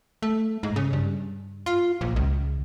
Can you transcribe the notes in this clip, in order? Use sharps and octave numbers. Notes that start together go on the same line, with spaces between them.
A3
G#2
C#3
G2
F4
A#1
C#2